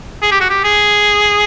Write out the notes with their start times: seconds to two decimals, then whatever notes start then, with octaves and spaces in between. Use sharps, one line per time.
0.22 G#4
0.32 G4
0.41 F#4
0.50 G4
0.64 G#4